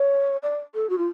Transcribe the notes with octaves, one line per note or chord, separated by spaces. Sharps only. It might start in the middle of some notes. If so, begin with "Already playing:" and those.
Already playing: C#5
D5
A4
F#4
F4